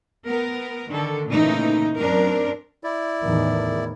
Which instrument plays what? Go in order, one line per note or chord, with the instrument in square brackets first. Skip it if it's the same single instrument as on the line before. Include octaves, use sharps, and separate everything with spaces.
[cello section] B3 A#4
D3 D#3 A4
A#2 C#3 E3 A3 D#4
F#2 C4 D4 A#4
[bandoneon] E4 D5
[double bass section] E2 A2 D#3